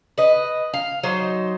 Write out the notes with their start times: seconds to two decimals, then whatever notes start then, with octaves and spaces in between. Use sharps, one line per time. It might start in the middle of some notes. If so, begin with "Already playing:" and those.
0.18 B4 D#5
0.74 F5
1.03 F#3 D#4 C5